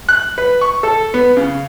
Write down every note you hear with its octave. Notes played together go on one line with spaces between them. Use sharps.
F#6
B4
C#6
A4
B3
C#3